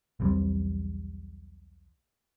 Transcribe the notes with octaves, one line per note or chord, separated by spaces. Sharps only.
B1 E2 G3 C4